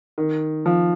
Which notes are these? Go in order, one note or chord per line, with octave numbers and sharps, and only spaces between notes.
D#3
F3